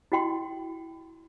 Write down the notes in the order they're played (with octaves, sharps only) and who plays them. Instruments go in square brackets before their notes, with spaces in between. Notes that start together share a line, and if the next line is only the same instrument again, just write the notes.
[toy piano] E4 F#4 G5 C6